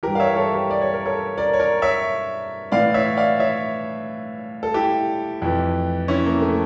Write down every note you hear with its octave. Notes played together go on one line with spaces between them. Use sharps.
G2 E3 G4 A#4
F5
C#5 E5
A4 C#5
G4 A#4
D5
C#5
A#4
A4 C#5
A#4 D5
C#5
A#4 D5
C#5 E5
A2 E3 D5 F5
C#5 E5
D5 F5
C#5 E5
A4
E4 G4
F2 E3
C#4 E4
A#3
A3